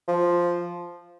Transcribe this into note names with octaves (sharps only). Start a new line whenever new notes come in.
F3